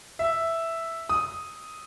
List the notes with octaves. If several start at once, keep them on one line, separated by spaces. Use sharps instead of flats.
E5
D#6